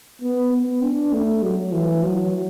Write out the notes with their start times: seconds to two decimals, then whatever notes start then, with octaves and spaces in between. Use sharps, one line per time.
0.22 B3
0.52 B3
0.82 D4
1.12 A3
1.43 F#3
1.72 E3
2.03 F#3